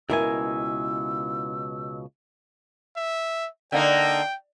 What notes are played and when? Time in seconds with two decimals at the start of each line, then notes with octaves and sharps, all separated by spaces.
0.10 C#2 B2 E4 A#4 G#5 E6
2.97 E5
3.72 D3 A#3 D#4 G5